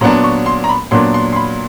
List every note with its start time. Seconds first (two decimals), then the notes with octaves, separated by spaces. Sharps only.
0.01 A#2 F#3 B3 D4 A#5
0.24 C#6
0.46 C6
0.64 A#5
0.69 B5
0.91 A#2 F#3 B3 D4 C6
1.14 C6
1.32 C6
1.36 B5